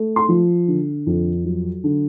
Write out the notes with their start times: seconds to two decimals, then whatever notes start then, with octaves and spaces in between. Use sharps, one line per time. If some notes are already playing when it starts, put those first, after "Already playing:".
Already playing: A3
0.16 C6
0.29 F3
0.68 D3
1.07 F2
1.44 F#3
1.84 D3